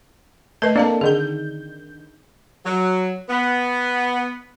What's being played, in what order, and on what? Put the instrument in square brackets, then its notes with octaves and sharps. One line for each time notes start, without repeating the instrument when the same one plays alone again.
[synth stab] A3 [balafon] A#4 B4 D#5
[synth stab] A#3 D4 A4 [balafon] C4 F5 A5
[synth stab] D3 D#3 G6 [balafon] G#4
[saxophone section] F#3
B3